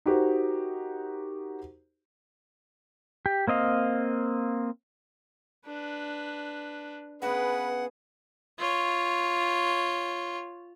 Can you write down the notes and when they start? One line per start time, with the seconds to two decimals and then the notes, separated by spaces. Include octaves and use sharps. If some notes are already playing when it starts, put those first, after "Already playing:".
0.06 D#4 F#4 G4 A#4 C5
3.26 G4
3.48 A#3 C4 D#5 F5
5.66 D4 B4
7.22 C#3 B3 G#4 B4 F#5
8.58 F4 C#5